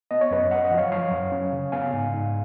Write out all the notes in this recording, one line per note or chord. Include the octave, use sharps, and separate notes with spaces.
B3 D#5
C#5
F#2 B4 D#5
F#2 D#5 F#5
D#5 F#5
F3
C#5 F5
F#3 C#5 F5
F#2
C#4
C#3
B3 F5 G#5
G#2
G#2